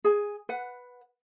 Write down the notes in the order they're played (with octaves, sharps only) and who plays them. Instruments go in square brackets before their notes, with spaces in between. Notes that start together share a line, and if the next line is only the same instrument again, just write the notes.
[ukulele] G#4 G#5
B4 F#5